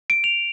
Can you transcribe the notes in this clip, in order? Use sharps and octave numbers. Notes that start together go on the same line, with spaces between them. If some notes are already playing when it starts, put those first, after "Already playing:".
D7
F7